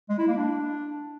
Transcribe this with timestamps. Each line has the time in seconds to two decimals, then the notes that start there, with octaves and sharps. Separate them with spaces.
0.09 G#3
0.19 E4
0.28 A#3
0.37 D4